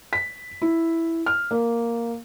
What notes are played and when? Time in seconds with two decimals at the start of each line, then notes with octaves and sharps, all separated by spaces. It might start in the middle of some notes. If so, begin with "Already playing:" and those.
0.13 B6
0.62 E4
1.26 F6
1.51 A#3